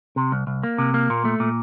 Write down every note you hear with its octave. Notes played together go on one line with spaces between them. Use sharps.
C3
C2
C2
A#3
C3
A#3
A#2
A3
A#2